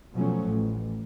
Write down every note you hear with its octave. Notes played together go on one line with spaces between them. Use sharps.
B2 F3 F#3 A3 C#4
A1